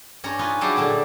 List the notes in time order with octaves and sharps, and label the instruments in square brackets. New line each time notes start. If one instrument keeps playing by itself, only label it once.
[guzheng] G2 C#4 C#5 A#5
D#4 F4 B4 C#5 G#5
F#3 G3 D4 E4 G4 G#4
A#2 D3 G3